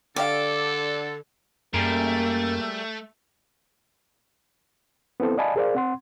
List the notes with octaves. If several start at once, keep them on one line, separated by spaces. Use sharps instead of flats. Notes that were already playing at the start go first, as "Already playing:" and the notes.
D3 G3 G4 A4 D5 F5
F#2 G3 A3 A#3 G#4 A#4
B3 C4 E4 A4 C5
D5 D#5 F5 G#5 A5 B5
G#4 A#4 C5 D5 F5
C4 F#5 C6